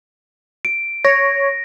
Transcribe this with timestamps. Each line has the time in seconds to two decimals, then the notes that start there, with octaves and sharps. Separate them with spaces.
0.65 D7
1.05 C#5 A#6